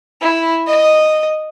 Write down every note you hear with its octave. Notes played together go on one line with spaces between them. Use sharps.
E4
D#5